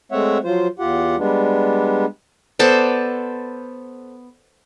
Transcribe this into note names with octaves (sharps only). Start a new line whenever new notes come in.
G#3 A3 C4 C#5 E5 F#5
F3 F#3 F4 C5
E2 F4 G4 F#5
G3 G#3 B3 D4
B3 A4 C5 D5